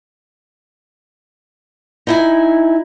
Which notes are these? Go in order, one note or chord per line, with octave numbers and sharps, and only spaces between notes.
D#4 E4 G#5